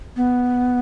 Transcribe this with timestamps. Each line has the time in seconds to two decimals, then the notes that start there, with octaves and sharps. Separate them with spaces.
0.17 B3